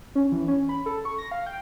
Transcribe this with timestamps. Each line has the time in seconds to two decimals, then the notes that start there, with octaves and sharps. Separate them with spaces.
0.15 C#4
0.32 E3
0.48 C#4
0.69 B5
0.86 A4
1.05 C#6
1.18 A#6
1.31 F5
1.46 G5